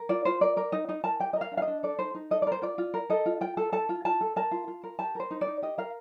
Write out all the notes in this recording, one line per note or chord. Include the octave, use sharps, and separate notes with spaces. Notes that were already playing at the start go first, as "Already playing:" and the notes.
Already playing: A#4
F4 D5
F4 C5
A#4 D5
A#4 D5
D#4 D#5
D#4 D#5
A#4 A5
G4 G5
D#5
A#4
F5
D4
F5
D#5
D4
A4 D5
D#4 C5
D#4
A4 D#5
D5
A#4 C5
F4 D5
F4
A#4
A4 D#5
F4
F4 G5
A4
A4 A5
F4
F4 A5
A4
A#4 A5
F4
F4
A#4
G4 A5
A#4 C5
D#4
D5
D#4
G4 D#5
A#4 F5